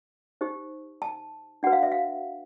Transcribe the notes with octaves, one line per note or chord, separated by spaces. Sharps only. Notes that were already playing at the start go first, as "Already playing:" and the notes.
D#4 G4 C5
A5
D4 F#4 B4 F#5
F5
E5
F5